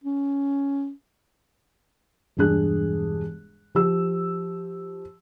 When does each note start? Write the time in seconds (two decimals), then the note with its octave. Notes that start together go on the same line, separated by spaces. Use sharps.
0.04 C#4
2.37 E1 G2 D4 G#4 F#6
3.75 F3 G4 E6